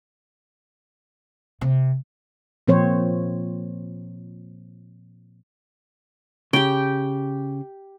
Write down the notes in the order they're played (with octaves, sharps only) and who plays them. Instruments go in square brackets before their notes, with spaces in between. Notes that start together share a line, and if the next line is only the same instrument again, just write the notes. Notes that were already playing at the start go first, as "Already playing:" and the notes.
[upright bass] C3
[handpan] A#2 F3 C4 C5 C#5
[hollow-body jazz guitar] C#3 [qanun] G4 G5